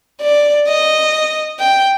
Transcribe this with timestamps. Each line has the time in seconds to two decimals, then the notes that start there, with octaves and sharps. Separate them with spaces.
0.22 D5
0.68 D#5
1.59 G5